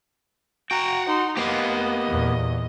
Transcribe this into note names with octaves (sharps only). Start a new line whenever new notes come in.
F#4 F#5 G5 A#5
D#4 C6
A#3 B3 G4 D#5 F5
E2 A#2